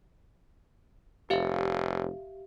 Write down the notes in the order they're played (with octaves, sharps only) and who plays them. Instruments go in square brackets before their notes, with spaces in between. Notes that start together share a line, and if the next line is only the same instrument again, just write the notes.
[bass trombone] F1 [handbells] G4 E5 F5